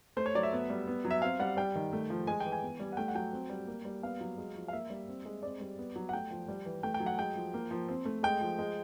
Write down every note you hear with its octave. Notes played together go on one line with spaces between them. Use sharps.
A3 C5
C#5
F#3 D5
E5
B3
G3
B3
F#3
E5
C4 F5
G3 F#5
G3 G5
D#3
A3
F3
G#3 G#5
E3 G5
G#5
B3
G3
F#5
A3 G5
F#5
F#3 G5
C4
G3
A#3
G3
B3 F5
F#3
G#3
F3
F5
A#3 E5
G3
C4
G#3
C4 D5
G3
B3
F#3
F#5
A3 G5
F3
G3
E3
A3 G5
G5
F#3
F#5
G#3 G5
F3
A#3
F3
C4
A3
G#3 G5
F3
G#3